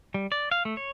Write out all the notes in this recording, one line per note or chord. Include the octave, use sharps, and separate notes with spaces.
G3
D5
F5
A3
C#5